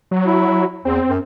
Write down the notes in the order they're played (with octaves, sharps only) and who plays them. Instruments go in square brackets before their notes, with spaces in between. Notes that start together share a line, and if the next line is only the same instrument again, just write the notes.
[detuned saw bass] F#3
[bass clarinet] E4
[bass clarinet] E2 [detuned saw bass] C4
[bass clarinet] F#2